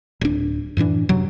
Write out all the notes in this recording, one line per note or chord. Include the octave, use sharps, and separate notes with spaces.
D1 D4
F#2 A2 E3 D4
F#2 C3 F#3